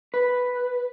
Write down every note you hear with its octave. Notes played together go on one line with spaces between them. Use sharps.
B4